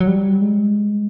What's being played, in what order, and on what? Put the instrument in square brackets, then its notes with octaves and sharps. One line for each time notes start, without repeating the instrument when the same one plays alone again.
[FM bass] F#3
G3
G#3